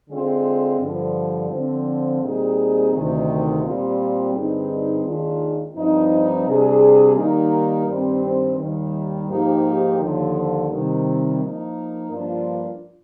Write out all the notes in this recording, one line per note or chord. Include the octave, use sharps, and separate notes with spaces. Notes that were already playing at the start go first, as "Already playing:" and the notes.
D3 G#3 C4 F4
G2 D3 F3
D3 F3 C4
A#2 G3 C4 D#4 G#4
D2 C3 D#3
A#2 G3 C4 F4
G2 D3 G#3 C4 D#4
D#2 D#3 G#3 D4 F4
G2 F3 C4 D#4
C3 G3 D4 G#4
D#3 G3 A#3 D#4 A#4
G2 D#3 G3 C4
D#2 D#3 G3
G#2 F3 A#3 D#4 G4
D#2 D3 F3
C3 D#3 G3
F3 A#3 D#4 A#4
G2 F3 A#3 D4 F4